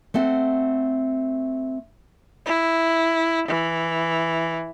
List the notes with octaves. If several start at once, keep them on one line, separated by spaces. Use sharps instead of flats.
A3 C4 F#5
E4
E3